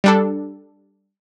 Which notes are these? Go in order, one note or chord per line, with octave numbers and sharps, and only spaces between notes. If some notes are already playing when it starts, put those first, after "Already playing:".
G3 D4 A4